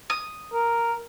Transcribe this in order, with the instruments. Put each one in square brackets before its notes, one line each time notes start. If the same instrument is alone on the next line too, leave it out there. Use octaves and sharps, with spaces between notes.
[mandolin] D#6
[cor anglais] A#4